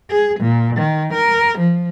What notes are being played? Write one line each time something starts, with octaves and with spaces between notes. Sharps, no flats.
G#4
A#2
D#3
A#4
F3